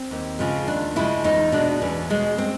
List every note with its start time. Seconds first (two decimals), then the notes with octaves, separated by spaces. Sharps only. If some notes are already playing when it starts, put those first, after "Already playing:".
Already playing: C4
0.11 D#2
0.39 C#3 F3 G#3
0.68 D#2 D4
0.96 C#3 F3 G#3 E4
1.24 E2 D#4
1.52 B2 G#3 D4
1.82 E2 C#4
2.10 B2 G#3
2.38 C4